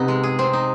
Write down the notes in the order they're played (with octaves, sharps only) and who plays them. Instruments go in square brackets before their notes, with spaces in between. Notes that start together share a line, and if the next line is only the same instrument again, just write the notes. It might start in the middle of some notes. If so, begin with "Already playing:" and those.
Already playing: [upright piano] C3 [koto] B3 D#4
[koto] G#3
G#4
C4
D#4